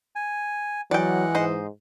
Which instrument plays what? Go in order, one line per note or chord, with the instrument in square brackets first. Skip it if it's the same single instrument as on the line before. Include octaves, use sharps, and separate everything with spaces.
[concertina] G#5
[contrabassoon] E3 [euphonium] F#3 [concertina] G#3 F#5 [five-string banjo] D5 G5
[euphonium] G#2 [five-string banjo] C5 D#5